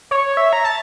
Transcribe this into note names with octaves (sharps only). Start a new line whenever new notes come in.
C#5
E5
A#5
A5